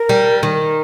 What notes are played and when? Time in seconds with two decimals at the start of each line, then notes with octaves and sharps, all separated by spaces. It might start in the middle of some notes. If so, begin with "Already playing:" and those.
Already playing: A#4
0.09 G3
0.43 D#3